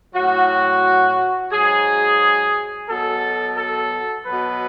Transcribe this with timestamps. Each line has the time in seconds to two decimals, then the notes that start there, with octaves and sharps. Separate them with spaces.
0.15 A2 F#3 F#4
1.52 G#2 F#3 G#4
2.89 B2 F#3 A4
3.57 A4
4.26 B2 F#3 B4